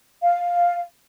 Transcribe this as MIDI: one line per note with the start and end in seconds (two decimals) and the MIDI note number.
0.22 0.80 77